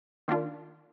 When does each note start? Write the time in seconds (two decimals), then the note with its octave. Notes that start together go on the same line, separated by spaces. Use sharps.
0.28 D#3 A#3 D4 F4